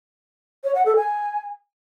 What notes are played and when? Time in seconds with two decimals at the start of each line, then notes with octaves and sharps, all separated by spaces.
0.64 C#5
0.75 F#5
0.86 A4
0.96 G#5